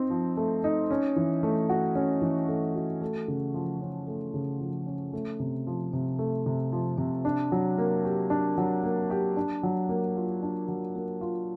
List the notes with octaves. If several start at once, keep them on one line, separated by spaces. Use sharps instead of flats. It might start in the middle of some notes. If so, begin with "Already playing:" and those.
Already playing: C4 D#4
F3
A3
D#4
C#4
E3
A3
F#4
C#4
E3
A3
F#4
A3
C#3
F3
C#4
A3
C#3
F3
C#4
A3
C3
F3
C3
A3
C3
F3
C3
D4
F#3
A#3
G4
D4
F#3
A#3
G4
D4
F#3
A#3
F4
D4
F#3
A#3
F4